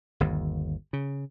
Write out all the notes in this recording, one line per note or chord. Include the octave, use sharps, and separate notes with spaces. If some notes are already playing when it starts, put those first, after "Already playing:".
G1 D#2
C#3